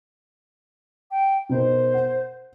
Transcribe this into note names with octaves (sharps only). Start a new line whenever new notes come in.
G5
B2 D#4 A#4 C5
F#5